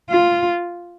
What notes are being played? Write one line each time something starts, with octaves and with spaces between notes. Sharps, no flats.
F4